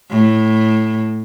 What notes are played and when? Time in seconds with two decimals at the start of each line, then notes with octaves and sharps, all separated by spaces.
0.11 A2